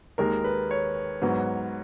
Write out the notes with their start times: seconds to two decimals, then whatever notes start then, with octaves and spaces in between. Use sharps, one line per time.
0.18 D#2 D#3 G#3 A#4
0.44 B4
0.71 C#5
1.22 G#2 F#3 B3